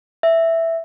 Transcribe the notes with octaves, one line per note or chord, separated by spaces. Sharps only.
E5